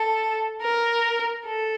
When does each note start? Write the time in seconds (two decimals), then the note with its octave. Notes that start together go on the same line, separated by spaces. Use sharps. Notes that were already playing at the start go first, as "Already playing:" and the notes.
Already playing: A4
0.62 A#4
1.46 A4